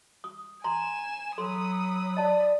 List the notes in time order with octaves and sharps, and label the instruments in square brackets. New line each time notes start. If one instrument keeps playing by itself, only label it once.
[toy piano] D#6
[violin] G#5 E7 [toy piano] A#5 C6
[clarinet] F#3 [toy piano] A4 C6 [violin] B5 D#6
[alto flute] D5 [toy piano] D#5 A5